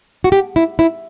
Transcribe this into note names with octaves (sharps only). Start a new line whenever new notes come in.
F#4
G4
E4
E4